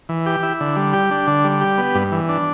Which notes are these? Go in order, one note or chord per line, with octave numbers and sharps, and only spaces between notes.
E3
G4
E4
D3
G3
G4
D4
D3
G3
G4
B3
G2
E3
D4